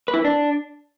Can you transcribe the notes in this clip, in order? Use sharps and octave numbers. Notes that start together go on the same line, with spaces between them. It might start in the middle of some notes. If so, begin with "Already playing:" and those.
B4
E4
B4
D4